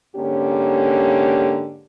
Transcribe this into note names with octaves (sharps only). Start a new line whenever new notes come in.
G#2 D3 A#3 C#4 G4